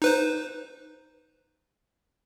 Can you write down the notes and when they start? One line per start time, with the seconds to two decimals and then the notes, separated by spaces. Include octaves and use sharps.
0.02 D#4 B4 C5